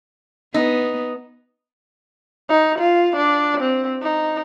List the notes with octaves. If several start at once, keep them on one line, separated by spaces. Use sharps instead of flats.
B3 D#4
D#4
F4
D4
C4
D#4